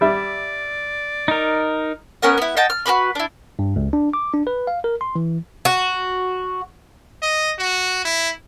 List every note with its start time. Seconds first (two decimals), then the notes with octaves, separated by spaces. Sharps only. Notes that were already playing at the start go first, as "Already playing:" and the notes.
0.01 G3 D5 E5
1.28 D#4 A#4
2.22 B3 C#4 A#4 F#5
2.38 B3 E4
2.57 D#5 F#5 G5 A5
2.70 F6
2.86 F#4 G4 B4 B5
3.15 D4 E4
3.59 G2
3.76 C#2
3.93 D4
4.13 D6
4.34 D4
4.47 B4
4.67 F5
4.84 A#4
5.01 C6
5.16 E3
5.65 F#4
7.22 D#5
7.58 F#4
8.05 E4